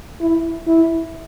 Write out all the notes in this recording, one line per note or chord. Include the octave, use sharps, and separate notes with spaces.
E4
E4